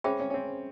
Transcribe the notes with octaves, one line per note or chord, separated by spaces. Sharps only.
C#4 G#4 C5 E5 G5 B5
C#4
C#4
C4